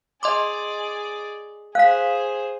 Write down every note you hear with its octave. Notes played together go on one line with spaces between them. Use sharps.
G#4 D5 D#5 C6 D6
G#4 C5 F5 F#6 B6